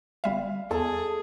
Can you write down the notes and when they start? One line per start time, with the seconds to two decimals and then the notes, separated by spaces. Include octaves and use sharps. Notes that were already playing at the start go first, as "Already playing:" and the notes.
0.24 G1 G3 E5 F5
0.71 E2 G#4 A4